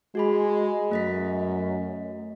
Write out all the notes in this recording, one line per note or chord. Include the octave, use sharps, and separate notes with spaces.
G#3 F#4 G#4 B5
F#2 A3 D#5 B6